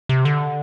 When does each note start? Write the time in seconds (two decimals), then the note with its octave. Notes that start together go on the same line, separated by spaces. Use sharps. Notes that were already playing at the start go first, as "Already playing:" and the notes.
0.09 C3
0.25 D3